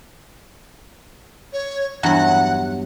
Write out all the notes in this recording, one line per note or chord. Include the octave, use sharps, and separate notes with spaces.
C#5
E2 G2 F#3 F#5